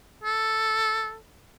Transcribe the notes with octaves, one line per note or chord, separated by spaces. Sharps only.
A4